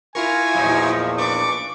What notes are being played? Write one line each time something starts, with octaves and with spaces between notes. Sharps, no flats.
E4 F4 A#4 G#5 C#6
E2 A#2 F3 F#3 D#4
D4 B4 C#6 D6